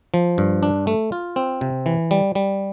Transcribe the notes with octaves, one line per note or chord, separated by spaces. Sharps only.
F3
G2
D4
A3
F4
C4
C3
E3
G3
G3